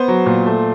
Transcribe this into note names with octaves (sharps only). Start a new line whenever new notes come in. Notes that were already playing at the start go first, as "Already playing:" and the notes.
Already playing: B3 C5
F#3
A#2
A3